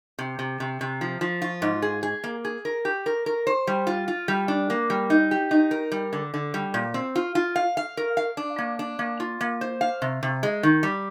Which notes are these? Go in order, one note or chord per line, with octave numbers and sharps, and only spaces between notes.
C3
C3
C3
C3
F3
F3
F4
G#2
G#4
G#4
A#3
G#4
A#4
G4
A#4
A#4
C5
G3
F4
F4
G3
D4
A#3
G3
D#4
G4
D#4
A#4
G3
D3
D3
G3
A#2
C4
F4
F4
F5
F5
A#4
F5
D4
A#3
D4
A#3
F4
A#3
C5
F5
C3
C3
G#3
D#3
G3